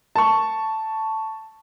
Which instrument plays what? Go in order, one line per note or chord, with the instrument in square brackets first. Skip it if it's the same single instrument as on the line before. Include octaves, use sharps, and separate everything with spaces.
[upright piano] A5 C#6